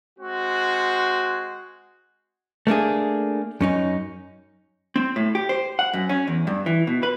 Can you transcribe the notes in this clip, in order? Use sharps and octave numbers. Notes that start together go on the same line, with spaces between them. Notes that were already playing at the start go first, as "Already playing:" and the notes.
G#3 C4 F#4
A3 A#3 D4 G#4
F#2 C#4 D#4
C4
A2
G4
C5
F#5
F#2
C#4
E2
G2
E3
B2
B4